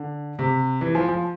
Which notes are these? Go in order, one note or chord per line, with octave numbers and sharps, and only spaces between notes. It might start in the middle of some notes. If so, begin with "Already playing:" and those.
Already playing: D3
C3
E3
F3
F3